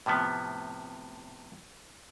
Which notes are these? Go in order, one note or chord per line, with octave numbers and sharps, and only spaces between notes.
A2 C3 F3 B3